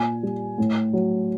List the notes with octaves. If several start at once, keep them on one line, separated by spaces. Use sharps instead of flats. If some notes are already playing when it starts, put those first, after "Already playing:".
Already playing: A#2 G#5
G3
A2
F#3